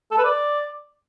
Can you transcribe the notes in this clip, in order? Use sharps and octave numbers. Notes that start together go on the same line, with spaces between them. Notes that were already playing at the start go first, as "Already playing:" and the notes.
A4
B4
D5